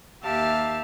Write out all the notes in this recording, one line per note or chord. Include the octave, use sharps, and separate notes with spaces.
D#2 G4 E5 F5 A5